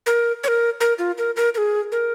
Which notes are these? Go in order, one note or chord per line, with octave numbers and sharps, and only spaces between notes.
A#4
C#5
A#4
A#4
F4
A#4
A#4
A#4
G#4
A#4